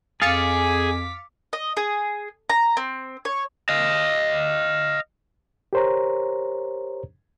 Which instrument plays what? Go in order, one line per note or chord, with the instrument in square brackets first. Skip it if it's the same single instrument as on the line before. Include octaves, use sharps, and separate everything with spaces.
[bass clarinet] F2 [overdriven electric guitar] G#4 [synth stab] F5 A6 C#7 [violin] D6 B6
[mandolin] D#5
G#4
A#5
C4
C#5
[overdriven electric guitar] D#5 F5
[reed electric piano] G4 A#4 C5 C#5 A#5